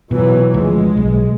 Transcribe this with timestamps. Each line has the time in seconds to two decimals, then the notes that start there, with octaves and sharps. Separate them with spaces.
0.11 B2 E3 F#3
0.54 D2 F3 G#3
0.97 B1